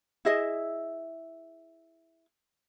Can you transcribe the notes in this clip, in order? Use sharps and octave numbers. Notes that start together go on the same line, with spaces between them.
E4 G#4 D#5 E5